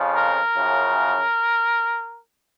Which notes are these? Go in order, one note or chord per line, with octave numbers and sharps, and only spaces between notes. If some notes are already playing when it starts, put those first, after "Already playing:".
Already playing: F2 C#3 F3
A#4
F#2 C#3 F3